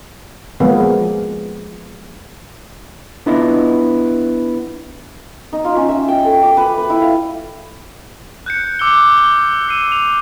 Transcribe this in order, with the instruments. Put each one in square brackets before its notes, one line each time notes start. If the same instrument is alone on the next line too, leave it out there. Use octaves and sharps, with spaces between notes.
[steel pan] F3 G#3 A#3 B3 G#4
[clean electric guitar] B3 D4 E4 F4 D#5
[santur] D#4
F4
C#4
E5
G5
A4
D6
B4
B4
E4
F5
[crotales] F#6 G6 C#7
D6 E6 C#7 G7
G7
E6 C7 D#7
F7